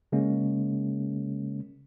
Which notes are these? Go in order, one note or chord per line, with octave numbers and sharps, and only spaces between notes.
C#3 G#3 A#3 C#4